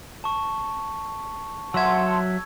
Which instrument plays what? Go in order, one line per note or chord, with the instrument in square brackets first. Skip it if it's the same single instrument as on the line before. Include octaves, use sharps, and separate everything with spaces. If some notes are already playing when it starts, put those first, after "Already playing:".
[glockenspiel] A5 C#6
[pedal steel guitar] F#3 E5 [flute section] F#5 A5 C6 [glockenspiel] E6 G#6